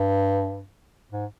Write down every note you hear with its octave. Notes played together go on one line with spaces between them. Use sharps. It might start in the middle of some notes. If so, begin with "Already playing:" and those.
Already playing: G2
G#2